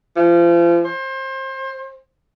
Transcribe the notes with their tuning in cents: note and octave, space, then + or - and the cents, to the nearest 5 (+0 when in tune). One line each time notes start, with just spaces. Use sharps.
F3 -35
C5 +30